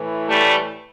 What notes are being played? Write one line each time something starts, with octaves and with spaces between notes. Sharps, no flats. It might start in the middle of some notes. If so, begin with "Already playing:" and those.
Already playing: A2 E3
G3 A3